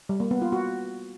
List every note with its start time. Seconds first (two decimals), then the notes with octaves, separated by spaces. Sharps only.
0.09 G3
0.20 A#3
0.31 B3
0.42 F4
0.52 F#4